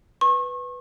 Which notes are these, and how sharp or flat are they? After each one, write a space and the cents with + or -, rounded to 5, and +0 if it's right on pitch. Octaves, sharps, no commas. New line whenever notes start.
B4 +5 C#6 -35